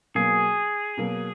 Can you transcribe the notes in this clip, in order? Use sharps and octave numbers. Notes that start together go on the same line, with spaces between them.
B2 F#3 A#3 G#4
B2 F#3 A#3